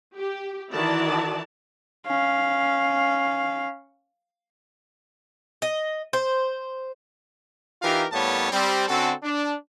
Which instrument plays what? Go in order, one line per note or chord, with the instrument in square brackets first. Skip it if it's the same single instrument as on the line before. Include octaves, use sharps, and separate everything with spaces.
[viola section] G4
D#3 E3 E4 F#4 D5 A5
[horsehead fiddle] C#4 F5
[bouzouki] D#5
C5
[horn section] E3 D#4 F4 G4 A#4 F5
A2 G3 A#3 B3 C#5 A5
G3 C4
D3 C4 C#4 F#4 A4
D4